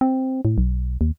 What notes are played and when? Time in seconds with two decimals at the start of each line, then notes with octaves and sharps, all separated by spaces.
0.01 C4
0.45 A2
0.58 B1
1.01 D#2